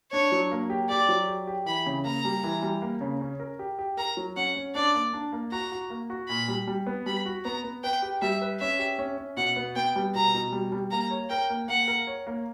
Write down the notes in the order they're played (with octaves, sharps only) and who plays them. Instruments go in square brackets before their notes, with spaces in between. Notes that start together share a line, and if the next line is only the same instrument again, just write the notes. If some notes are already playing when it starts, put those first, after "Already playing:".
[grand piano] D4 [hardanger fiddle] C#5
[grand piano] F#3
A#3
G4
[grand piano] G4 [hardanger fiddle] D5
[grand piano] F#3
G4
G4
[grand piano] E3 [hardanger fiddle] B5
[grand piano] C#3
[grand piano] A#3 [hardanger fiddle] A#5
[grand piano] G3
E3
G3
A#3
C#3
C#4
A#4
G4
G4
[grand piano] A#4 [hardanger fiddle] A#5
[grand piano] F#3
[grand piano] C#4 [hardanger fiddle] F#5
[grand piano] C#4
[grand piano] D4 [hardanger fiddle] D5
[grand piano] A#3
D4
A#3
[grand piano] F#4 [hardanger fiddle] A#5
[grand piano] F#4
A#3
F#4
[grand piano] A#2 [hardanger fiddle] B5
[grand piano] G3
G3
B3
[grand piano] G3 [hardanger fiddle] B5
[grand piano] F#4
[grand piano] B3 [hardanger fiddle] A#5
[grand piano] B3
[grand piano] B4 [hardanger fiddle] G5
[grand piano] G4
[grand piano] G3 [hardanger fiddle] E5
[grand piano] B4
[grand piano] C#4 [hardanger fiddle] E5
[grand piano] G4
C#4
C#4
[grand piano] B2 [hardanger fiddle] F#5
[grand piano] B3
[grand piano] B3 [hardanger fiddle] G5
[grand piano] G3
[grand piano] B2 [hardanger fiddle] A#5
[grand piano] B2
G3
G3
[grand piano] A#3 [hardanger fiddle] A#5
[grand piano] C#5
[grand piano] A#4 [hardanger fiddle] G5
[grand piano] A#3
[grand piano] A#3 [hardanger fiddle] F#5
[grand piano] A#4
C#5
A#3